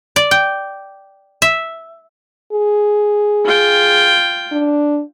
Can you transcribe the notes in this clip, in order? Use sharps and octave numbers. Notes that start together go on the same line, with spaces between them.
D5
G5
E5
G#4
F4 G5
D4